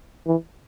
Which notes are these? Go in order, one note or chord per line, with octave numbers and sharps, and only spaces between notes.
E3